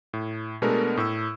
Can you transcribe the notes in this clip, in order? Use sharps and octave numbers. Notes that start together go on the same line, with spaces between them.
A2
B2 G#3 A3 B3 D4 A#4
A2 E6